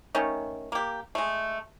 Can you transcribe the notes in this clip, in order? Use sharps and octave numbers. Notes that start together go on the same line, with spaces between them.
D#3 A3 C#4
A#3 G4
G#3 A3